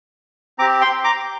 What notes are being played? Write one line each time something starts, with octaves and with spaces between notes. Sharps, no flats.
C4 G4 A#5 D6
G5 C6
A#5 D6